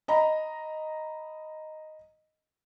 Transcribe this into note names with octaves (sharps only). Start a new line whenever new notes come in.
D#5 A#5 B5